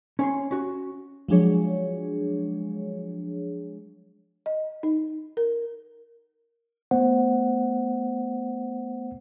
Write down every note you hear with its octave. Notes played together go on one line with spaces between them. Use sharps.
C#4 C#5 C6
C#4 F#4
F3 F#3 G#3 D4 G#4 C#5
D#5
D#4
A#4
A3 B3 C5 F#5